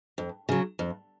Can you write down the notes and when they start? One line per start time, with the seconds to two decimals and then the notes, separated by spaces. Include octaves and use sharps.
0.18 F2
0.49 C#3 F#3
0.79 F2